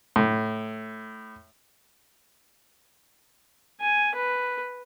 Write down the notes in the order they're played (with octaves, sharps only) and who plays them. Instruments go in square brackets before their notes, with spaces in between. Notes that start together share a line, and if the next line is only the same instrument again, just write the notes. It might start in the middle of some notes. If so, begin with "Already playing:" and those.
[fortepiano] A2
[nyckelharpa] G#5
B4